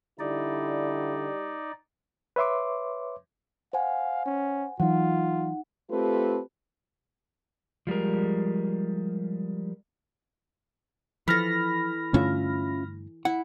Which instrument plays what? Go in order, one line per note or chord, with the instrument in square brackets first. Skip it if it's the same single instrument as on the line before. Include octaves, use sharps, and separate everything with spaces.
[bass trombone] D3 [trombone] G3 [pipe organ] D#4 D5 [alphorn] E4
[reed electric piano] B4 C#5 E5 C6 D6
[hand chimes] C5 F#5 G#5 [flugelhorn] F5
[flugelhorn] C#4
[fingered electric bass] E3 F#3 [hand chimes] D#4 F#5 [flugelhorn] F4
[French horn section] A3 C4 F4 G4 A4 B4
[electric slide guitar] F3 G3 G#3 A#4
[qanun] E3 A4 [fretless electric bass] F3 [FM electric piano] B5 F6 A#6
[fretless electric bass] G2 D3 A3 [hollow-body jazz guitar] C#4 F4 E5
[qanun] E4 [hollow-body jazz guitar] F#5